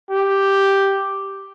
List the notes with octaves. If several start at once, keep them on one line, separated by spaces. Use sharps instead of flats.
G4